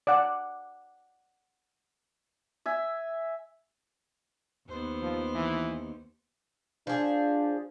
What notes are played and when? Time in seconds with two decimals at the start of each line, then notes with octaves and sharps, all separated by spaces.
0.07 D5 F#5
2.66 E5 G#5
4.68 D#2 B3 C5
5.02 F3
5.35 E3
6.87 F3 D4 G#4